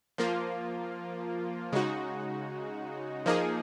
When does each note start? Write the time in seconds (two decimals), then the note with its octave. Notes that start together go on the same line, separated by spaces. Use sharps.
0.18 F3 A#3 F4
1.72 C#3 G#3 D#4 F#4
3.26 F3 A#3 D#4 G#4